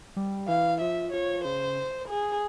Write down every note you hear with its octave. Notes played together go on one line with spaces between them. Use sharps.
G3
E3 F5
F3 E5
F3 C#5
C#3 C5
G#4